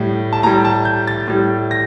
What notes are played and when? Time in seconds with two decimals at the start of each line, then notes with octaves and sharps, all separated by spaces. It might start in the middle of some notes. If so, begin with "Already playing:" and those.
Already playing: A2 G3
0.33 A5
0.43 A2 G3 A#5
0.65 A5
0.85 G6
1.07 A6
1.28 A2 G3
1.71 A#6